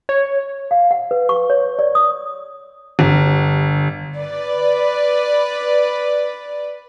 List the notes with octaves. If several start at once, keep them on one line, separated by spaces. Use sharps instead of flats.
C#5
F5
F#5
B4
C#6
C#5
D5
D#6
G1
B4 D5